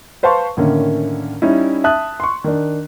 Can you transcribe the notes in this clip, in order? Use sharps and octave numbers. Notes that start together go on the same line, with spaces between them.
B4 C5 F5 A5 C6 C#6
A2 D3 D#3 A#3 C#4
G3 C#4 D#4 E4
E5 A5 D#6 F#6
C6 C#6
D#3 D4